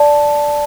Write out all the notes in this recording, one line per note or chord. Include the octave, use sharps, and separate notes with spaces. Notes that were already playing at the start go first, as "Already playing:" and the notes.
Already playing: D5 A5